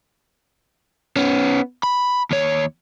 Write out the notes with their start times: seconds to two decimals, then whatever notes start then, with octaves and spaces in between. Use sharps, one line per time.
1.17 B3 C#4
1.83 B5
2.31 D#2 C#5